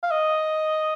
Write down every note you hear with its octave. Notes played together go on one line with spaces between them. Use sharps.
F5
D#5